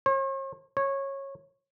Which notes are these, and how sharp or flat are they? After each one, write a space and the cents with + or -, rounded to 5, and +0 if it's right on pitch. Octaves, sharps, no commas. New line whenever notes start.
C#5 -45
C#5 -15